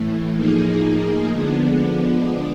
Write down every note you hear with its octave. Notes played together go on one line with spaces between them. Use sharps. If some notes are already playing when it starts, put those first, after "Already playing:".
Already playing: A2 E3 A3
A2 F3 A#3 D#4 G#4
D3 F3 G#3 B3 D4